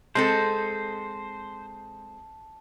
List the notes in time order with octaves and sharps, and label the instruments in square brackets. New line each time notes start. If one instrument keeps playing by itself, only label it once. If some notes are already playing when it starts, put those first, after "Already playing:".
[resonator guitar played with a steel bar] G#3 C4 A4 [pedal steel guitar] C5 [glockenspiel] A5